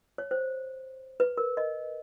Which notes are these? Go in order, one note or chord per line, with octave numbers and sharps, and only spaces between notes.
C#5
C5
B4
A#4
D#5